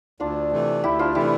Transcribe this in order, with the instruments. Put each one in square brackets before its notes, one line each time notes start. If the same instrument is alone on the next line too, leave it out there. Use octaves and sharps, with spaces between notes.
[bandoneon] D2 [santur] D4 F4
[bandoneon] C3 E3 A3
[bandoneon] D2 [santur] E4 G4
[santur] D4 F4
[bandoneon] C3 E3 A3 [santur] E4 G4